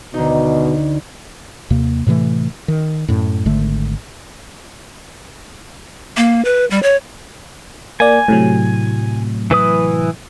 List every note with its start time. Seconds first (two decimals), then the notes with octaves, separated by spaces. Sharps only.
0.14 D2 B2 D#4
1.70 D#2 C3 A#3
2.07 A2 C3 E3 A3
2.68 D#3
3.09 F#2 A2
3.45 G#1 D3 A3
6.17 A#3
6.45 B4
6.71 G3
6.83 C#5
8.00 A#3 D5 G#5
8.28 A2 C3 F#3
9.51 E3 B4 D#6